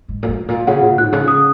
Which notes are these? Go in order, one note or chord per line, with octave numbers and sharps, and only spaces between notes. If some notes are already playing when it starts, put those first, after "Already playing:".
G#2
A#2
G#2
A#2
C#3 F#5
A#2
G#2 F#6
C#3
D#6